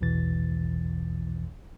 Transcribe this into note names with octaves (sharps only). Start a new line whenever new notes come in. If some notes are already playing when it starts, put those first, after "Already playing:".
A#1 E2 B2 E3 A6